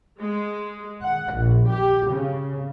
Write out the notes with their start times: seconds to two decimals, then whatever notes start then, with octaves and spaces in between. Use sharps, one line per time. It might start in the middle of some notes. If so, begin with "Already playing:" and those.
0.20 G#3
1.04 F#5
1.35 A#1
1.71 G4
2.13 C#3